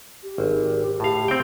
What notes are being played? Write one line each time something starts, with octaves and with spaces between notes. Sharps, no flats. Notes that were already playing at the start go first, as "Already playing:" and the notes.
G4
G#1
A2 F5
C4 G5